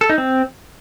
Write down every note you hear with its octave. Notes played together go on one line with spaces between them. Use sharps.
A4
D#4
C4